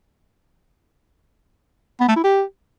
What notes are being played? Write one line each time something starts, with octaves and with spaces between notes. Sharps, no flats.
B3
A3
E4
G4